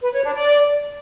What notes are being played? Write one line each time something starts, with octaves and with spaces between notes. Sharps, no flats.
B4
C#5
D4
D5